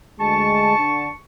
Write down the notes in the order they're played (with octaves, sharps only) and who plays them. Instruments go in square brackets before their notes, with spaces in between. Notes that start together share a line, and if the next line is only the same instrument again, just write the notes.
[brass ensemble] D2 G#3 [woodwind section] A5 [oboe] C#6
[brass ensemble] D3